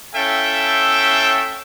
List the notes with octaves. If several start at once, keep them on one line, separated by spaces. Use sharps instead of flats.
C#4 E4 A4 E5 F5 G5